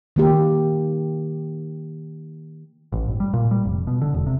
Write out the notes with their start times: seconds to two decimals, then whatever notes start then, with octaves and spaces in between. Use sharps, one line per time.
0.16 D#3 A#3 G4
2.92 A1
3.08 G1
3.20 G3
3.34 A#2
3.51 G3
3.65 F1
3.87 B2
4.02 D3
4.14 E1
4.27 C3